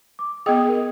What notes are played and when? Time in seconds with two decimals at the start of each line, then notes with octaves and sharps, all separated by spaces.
0.19 D6
0.46 B3 G#4 D#5 G5 D#6
0.69 A#4